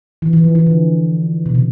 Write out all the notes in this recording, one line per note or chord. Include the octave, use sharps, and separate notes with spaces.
E3
E3
F3
E3
D3
B2
C3